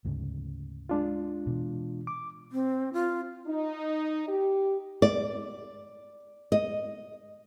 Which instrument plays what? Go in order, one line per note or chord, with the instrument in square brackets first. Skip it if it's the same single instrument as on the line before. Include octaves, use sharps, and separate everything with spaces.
[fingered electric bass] D2 G#2 C#3
[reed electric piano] G#3 D4 F4
[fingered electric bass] B2 E3
[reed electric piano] D6
[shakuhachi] C4
F4
[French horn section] D#4
G4
[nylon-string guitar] D5
D#5